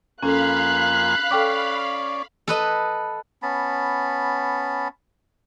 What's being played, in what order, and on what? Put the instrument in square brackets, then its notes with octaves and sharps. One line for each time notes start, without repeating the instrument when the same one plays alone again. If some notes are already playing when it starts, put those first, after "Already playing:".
[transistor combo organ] F2 A#3 G#5 [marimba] C#4 A4 [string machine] F5 B5 [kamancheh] F#6
[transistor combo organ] C#4 D5 [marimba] A4 G5 D6
[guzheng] A4 B4 D#5
[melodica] B3 C#4 A5 B5